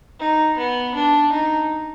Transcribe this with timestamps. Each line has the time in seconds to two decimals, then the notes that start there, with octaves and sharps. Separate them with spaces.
0.19 D#4
0.57 B3
0.95 D4
1.32 D#4